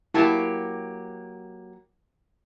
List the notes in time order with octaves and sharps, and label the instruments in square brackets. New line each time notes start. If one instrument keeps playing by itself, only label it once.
[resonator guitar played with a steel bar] F#3 A#3 G4 [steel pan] E4 A5